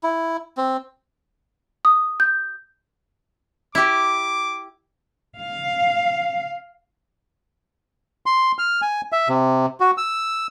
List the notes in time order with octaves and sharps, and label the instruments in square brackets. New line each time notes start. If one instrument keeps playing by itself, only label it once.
[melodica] E4
C4
[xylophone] D#6
G6
[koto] E4 G4 [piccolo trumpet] D6
[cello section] F5
[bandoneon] C6
F6
G#5
E5
C3
F#4
E6